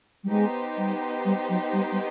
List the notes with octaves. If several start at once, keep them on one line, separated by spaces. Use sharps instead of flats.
G3
G#3 B3 D#4 G4 C5
G3
G3
F#3
G3
G3